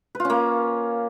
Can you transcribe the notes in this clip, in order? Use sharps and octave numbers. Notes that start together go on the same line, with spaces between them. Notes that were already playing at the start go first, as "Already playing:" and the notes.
B4
F4
C#4
A#3